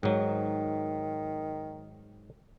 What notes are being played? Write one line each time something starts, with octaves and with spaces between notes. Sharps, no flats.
G#2 D#3 F#3